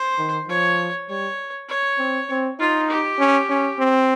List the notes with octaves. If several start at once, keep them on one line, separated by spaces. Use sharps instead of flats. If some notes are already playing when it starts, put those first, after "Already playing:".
Already playing: C5
D#3
F3 C#5
G3 C#5
C#5
C4
C4
D#4 F4
G4
C#4
C#4
C4